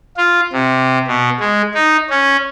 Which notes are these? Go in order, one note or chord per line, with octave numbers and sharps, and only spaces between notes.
F4
C3
B2
G#3
D#4
C#4